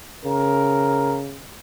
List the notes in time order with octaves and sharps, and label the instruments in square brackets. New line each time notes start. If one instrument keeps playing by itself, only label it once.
[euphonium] C#3 [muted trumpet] A#4